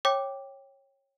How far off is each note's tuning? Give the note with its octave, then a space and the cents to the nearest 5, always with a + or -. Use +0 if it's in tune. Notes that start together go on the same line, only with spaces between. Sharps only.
C#5 -15 G5 +0 D6 +0